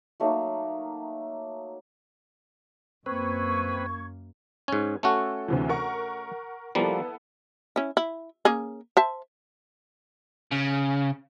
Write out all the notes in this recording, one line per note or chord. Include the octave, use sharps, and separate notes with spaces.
F#3 A3 A#3 D#4
F#2 A#3 C4 B4 C#6 G#6
G#2 C#4 G#6
A3 C#4 F#4 A4
D2 C3 E3
A#4 F#5 C#6
F3 G3 A#3 B3 E4 A4
C#4 E4
E4
A#3 C#4 G#4
C5 E5 A5
C#3